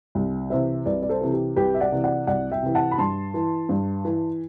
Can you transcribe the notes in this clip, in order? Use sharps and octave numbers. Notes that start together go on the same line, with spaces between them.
C2
C3 E3 C5 E5
C2 B4 D5
D5
A4 C5
C3 E3
G4
C2 G4 B4
E5
D5 F#5
C3 E3
D5 F#5
C2 D5 F#5
E5 G5
C3 E3
F#5 A5
B5
G2 A5 C6
E3
G2
E3